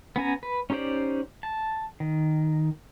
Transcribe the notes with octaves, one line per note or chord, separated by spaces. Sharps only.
B3 C#4 G#5 A#5
B4
C#4 D#4 G4 C5 D5
A5
D#3